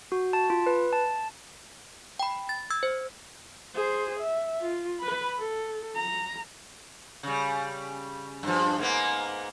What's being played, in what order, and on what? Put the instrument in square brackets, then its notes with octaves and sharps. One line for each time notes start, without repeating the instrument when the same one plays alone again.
[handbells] F#4
A5
F4
B4
A5
G5 B5
A6
E6 G#6
C5
[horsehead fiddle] G#4 C5
E5
F4
B4 B5
A4
A#5
[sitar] C#3 G3
G2 F3
G#2 A#3 B3